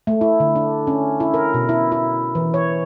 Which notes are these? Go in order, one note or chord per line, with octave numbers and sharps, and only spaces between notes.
A3
E4
D3
D4
C#4
E4
A#4
B2
E4
E4
E3
C#5